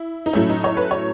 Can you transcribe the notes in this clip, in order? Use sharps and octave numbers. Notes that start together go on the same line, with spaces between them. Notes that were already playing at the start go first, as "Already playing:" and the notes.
Already playing: E4
D#4
A2 F#3 A3 C#4 E4
D#4
C#5
B4
C#5